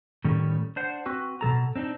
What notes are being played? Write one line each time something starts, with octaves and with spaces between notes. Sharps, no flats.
A2 D#3 G3 C#4 A4
D4 C5 F#5
C4 F#4 B4
B2 D#3 A4 A#5
C4 D4 D#4